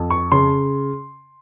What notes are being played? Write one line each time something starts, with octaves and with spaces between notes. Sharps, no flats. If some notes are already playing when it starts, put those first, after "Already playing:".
Already playing: F2
C#6
C#3 C6